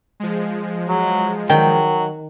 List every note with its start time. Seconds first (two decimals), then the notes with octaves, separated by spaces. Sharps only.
0.20 F3 G#3
0.88 F#3
1.50 D#3 F#3 G5